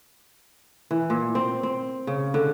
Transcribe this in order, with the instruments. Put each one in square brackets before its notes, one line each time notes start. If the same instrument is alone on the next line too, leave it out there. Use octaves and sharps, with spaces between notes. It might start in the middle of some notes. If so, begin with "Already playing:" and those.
[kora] E3
A#2
C4
C4
C#3
D3